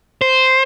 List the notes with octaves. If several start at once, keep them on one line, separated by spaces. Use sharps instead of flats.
C5